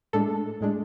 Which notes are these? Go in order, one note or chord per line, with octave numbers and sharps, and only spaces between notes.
A2 G#3 D4 A4
A2 G#3 D4